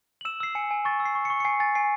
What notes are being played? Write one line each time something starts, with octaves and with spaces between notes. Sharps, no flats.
F#7
E6 E7
E6 C7
G#5 C#7
G#5
C#6 A6
E6
C7
C#6
C#6 C#7
C#7
G#5 C7
G#5 A6
G#5 C7